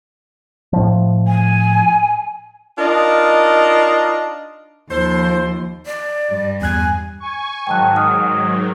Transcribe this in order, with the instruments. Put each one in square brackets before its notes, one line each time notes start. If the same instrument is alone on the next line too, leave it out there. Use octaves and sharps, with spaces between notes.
[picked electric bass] A2 F3
[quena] G#5
[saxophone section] D4 D#4 F4 A#4 D#5
[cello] D#2 F3 [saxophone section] A4 C5
[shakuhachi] D5
[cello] G2 G3
[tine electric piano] E2 F#6 G#6 [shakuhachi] G#5
[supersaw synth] G#5 C#6
[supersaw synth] G#2 D#3 F#3 [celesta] G5 A5 F#6
[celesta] D#6 F6